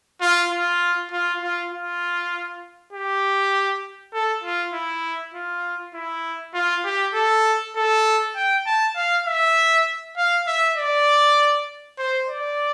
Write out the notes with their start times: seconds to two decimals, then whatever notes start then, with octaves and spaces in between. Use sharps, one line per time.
0.21 F4
0.51 F4
1.11 F4
1.42 F4
1.71 F4
2.93 G4
4.13 A4
4.43 F4
4.73 E4
5.34 F4
5.94 E4
6.54 F4
6.85 G4
7.15 A4
7.76 A4
8.36 G5
8.66 A5
8.96 F5
9.27 E5
10.17 F5
10.47 E5
10.77 D5
11.99 C5
12.28 D5